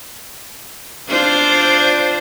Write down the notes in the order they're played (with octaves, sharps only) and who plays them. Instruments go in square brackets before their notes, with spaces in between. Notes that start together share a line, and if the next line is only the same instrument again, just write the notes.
[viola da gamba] D4 F4 C5